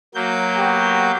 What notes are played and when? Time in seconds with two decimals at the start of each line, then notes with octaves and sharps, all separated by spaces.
0.15 F#3 A#3 G6
0.57 B3 F#4 G4